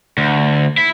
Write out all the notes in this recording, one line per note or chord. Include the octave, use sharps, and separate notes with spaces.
D2
E4